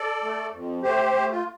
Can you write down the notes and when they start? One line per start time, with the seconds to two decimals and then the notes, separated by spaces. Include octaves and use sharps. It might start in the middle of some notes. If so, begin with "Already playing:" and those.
Already playing: A4 D5
0.23 A3
0.52 F2
0.83 A3 G4 C5
1.13 A3
1.31 F4